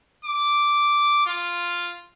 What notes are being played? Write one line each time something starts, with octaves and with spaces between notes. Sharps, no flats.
D6
F4